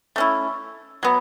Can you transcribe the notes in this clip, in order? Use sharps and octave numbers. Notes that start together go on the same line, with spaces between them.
A3 C#4 E4
F#3 B3